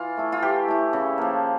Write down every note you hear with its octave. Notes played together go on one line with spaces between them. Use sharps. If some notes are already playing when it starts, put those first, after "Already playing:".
Already playing: E3 F4
A3 E4
F4
E3 G4
A3 E4
C#3
F3 A#3